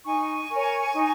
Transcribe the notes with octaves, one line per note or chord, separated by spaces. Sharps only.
D#4 G#5 C#6
A#4 C#5
D#4